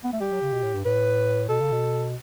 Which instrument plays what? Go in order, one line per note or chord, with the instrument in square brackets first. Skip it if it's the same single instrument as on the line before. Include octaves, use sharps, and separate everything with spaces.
[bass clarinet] B3
A3
[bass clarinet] G3 [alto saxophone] G4
[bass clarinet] F#3
C#3
B2
A2
G2
[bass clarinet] A2 [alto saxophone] B4
[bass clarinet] B2 [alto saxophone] A4
[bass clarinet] C#3
B2